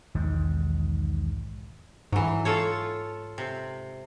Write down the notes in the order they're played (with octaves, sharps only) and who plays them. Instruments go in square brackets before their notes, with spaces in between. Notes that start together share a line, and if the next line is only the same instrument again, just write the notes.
[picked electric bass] B1 E2 G#2 D#3
[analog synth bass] G#2 [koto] E3 F#3
[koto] F4 A4 C#5
C3